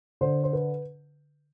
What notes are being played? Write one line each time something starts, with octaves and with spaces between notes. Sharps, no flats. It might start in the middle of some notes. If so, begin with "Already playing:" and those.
D3 C5
C5
B4